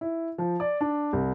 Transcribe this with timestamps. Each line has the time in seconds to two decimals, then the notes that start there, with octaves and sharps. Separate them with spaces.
0.01 E4
0.38 F3
0.60 D5
0.81 D4
1.13 C2